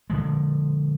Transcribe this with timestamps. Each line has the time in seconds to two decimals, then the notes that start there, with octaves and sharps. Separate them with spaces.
0.10 D3 F3 G#3